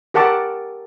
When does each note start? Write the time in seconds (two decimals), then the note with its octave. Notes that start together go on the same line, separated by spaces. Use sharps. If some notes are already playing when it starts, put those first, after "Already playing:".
0.14 G4 A#4 F#5 A5 D6